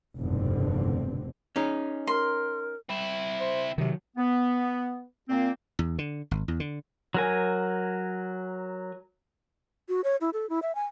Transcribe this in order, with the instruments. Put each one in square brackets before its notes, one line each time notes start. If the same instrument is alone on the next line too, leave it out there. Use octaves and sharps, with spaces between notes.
[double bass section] F1 B1 E2 G2 D3 C4
[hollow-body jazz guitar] C#4 D#4 G#4
[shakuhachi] A#4 [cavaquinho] C6
[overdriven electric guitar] C4 E4
[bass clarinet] C5
[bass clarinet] C3 [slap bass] D#3 F#3
[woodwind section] B3
A#2 A#3 C4
[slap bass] E2
D3
G#1
E2
D3
[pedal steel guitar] F#3 A#4 G#5
[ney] F#4
C#5
E4
A4
E4
E5
G#5